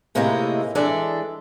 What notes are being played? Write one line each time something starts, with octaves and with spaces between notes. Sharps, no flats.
A2 C3 G#3 A#3 D#4 E4
E3 G#3 D4 A4 D5 E5